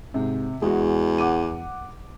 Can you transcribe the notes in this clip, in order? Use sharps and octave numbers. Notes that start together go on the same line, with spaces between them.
G#2 C3
E2 G#3 F#4
F#5 D6 D#7